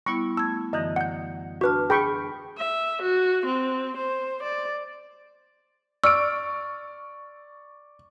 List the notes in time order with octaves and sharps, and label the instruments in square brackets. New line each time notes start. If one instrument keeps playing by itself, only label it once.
[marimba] G3 B3 E4 [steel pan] C#6
[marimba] A3 G#6 [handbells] E6
[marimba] F#2 D3 E3 [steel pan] D#5
[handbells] F#5 G6
[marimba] D4 A5 F6 [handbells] F#4 B4
[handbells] G#4 [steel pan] G5 B5 C#6
[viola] E5
F#4
C4
C5
D5
[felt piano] D5 [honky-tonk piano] C#6 F6 D7 [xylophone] E6